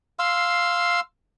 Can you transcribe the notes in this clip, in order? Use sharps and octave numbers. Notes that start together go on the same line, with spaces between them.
F5 C6 E6